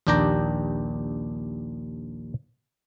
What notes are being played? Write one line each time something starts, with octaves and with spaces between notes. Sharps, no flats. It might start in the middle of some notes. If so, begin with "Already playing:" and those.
A#1 D#2 D4 G4 G5 A#5